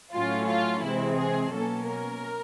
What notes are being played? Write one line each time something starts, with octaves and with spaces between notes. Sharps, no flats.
A2 F#3 A3 C#4 F4
F4
C3 E3 G#3 C4 E4
G#4
B2 F#3 A#3 C#4 A4
A#4